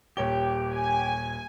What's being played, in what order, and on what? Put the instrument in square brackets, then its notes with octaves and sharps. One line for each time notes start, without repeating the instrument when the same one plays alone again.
[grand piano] D#1 C#5 G7 [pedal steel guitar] G4
[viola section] G#5